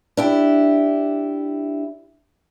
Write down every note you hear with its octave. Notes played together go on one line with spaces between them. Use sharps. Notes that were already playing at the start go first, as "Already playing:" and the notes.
D4 E4 G4